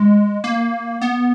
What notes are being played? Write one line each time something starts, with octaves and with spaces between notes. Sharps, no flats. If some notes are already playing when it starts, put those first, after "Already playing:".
Already playing: G#3
A#3
B3